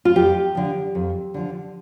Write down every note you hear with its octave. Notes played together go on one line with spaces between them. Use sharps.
F4
F2 G4
D3 F3
F2
D3 F3